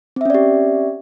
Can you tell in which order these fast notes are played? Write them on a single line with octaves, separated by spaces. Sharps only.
C4 E5 C#4 D5 G4